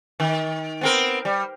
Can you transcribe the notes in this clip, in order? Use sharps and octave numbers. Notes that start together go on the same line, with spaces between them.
D#3
B3 C4 A#4
G3